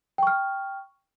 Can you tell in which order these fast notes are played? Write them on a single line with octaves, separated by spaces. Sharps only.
G5 C#6 F6